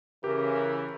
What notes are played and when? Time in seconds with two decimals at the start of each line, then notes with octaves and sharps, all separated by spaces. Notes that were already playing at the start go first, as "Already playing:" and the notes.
0.24 C#3 E3 G4 A#4